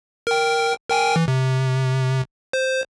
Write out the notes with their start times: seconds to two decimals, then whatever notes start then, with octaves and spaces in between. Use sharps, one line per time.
0.27 A#4 G5
0.89 A#4 G5 G#5
1.16 E3
1.28 C3
2.53 C5